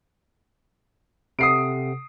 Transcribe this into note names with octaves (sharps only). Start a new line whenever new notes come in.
C3 A4 F#5 D#6 C7 D7